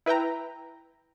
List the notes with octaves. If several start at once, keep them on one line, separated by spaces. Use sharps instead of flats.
E4 B4 E5 G5 A#5